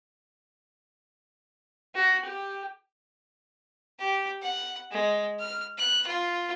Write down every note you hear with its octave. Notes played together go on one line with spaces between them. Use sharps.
F#4
G4
G4
F#5
G#3
F6
F#6
F4